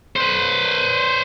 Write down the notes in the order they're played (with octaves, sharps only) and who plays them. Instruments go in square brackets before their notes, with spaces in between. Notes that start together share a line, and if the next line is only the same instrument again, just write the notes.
[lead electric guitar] B4 C5